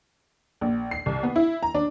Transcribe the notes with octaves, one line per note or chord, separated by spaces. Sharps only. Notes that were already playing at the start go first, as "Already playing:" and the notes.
A#1
C7
C2
B3
E4
A#5
D4